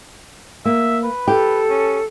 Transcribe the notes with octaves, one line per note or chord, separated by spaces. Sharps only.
A#3 E5
B4
G4 A4
C#4